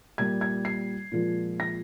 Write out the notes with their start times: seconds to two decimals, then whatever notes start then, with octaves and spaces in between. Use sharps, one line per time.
0.18 A#2 G3 A#3 G#6
0.41 G#6
0.65 C7
1.12 A#2 F3 G#3
1.60 A#6